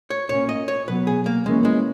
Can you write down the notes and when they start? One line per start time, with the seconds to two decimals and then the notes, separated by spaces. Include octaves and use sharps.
0.10 C#5
0.29 A#2 A#3 C#4 C#5
0.49 D#5
0.68 C#5
0.87 B2 F#3 B3 B4
1.07 G#4
1.26 A#3
1.45 E3 G#3 A#3 C#4
1.65 G#3